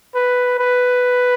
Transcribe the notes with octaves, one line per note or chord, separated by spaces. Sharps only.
B4
B4